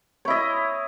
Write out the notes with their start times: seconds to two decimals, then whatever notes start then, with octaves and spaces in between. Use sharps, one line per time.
0.25 C#5
0.28 E4
0.30 D#5